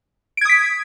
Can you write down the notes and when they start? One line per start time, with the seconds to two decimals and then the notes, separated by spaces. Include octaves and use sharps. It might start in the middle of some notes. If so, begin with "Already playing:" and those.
0.37 D7
0.41 G#6
0.45 D#6
0.49 B6